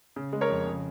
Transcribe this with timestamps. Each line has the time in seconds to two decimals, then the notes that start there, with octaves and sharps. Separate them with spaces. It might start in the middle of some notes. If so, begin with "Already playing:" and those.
0.16 C#3
0.33 G#3
0.41 A#4 C#5
0.50 F2
0.66 C#3